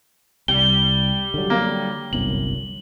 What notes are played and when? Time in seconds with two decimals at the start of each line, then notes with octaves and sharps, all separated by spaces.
0.48 C2 G3 G7
1.34 D3 F#3
1.50 A#3
2.13 G1 C2 F#2 F#7